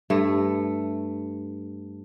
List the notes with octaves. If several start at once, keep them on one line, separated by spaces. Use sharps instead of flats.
G2 A3